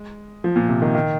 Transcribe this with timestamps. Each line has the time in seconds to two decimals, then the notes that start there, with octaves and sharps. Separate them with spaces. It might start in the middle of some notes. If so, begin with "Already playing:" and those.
Already playing: G#3
0.44 F3
0.56 A#2
0.69 C3
0.82 D#3
0.95 D#3